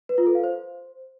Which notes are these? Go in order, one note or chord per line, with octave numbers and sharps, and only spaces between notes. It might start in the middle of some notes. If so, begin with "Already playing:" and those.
B4
F4
A4
F5
C5